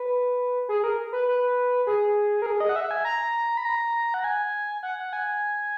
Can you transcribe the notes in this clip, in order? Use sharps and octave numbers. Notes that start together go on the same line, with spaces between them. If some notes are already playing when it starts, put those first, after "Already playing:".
Already playing: B4
G#4
A#4
B4
B4
G#4
A#4
G#4
D#5
F#5
E5
G#5
A#5
B5
A#5
F#5
G#5
F#5
F#5
G#5